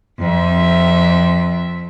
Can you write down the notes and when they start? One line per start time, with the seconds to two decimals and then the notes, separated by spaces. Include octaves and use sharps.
0.19 F2 E5